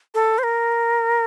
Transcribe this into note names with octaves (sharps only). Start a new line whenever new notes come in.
A4
C5
A#4